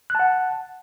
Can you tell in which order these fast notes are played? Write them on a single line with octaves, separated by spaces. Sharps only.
F#6 A5 F#5